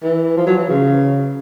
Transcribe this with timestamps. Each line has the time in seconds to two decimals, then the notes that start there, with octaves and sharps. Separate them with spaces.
0.03 E3
0.37 F3
0.47 F#3
0.58 E3
0.69 C#3